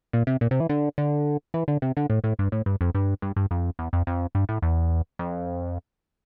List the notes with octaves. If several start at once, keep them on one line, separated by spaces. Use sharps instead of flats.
A#2
C3
A#2
C3
E3
D3
D3
E3
D3
C3
D3
A2
A2
G2
A2
G2
F2
G2
G2
G2
F2
E2
F2
F2
G2
A2
E2
F2